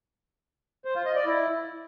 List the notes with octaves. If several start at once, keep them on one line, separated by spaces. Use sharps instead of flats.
C5
F4
D#5
D5
E4